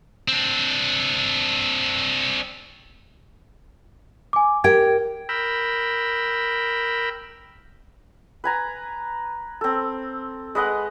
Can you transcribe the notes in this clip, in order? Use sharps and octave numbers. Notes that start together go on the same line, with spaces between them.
C4 D4
G#5 D6
G4 A#4 G5 G#6
A#4 G5 B5 E6
B4 G#5 A#5
C4 A4
G#3 B4 D#5 F#5